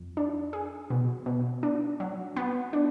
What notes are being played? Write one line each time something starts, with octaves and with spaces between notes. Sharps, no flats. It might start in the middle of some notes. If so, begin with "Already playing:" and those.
Already playing: F2
D4
G#4
B2
B2
D4
F#3
B3
D4